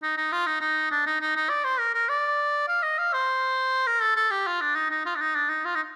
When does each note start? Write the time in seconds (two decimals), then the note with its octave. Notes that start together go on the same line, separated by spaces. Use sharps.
0.02 D#4
0.17 D#4
0.32 F4
0.46 D#4
0.61 D#4
0.91 D4
1.06 D#4
1.21 D#4
1.36 D#4
1.49 D5
1.64 C5
1.79 A#4
1.94 A#4
2.09 D5
2.68 F5
2.83 D#5
2.98 F5
3.13 C5
3.87 A#4
4.01 A4
4.16 A4
4.31 G4
4.47 F4
4.61 D4
4.75 D#4
4.90 D#4
5.06 F4
5.15 D4
5.21 D#4
5.35 D4
5.49 D#4
5.65 F4
5.75 D#4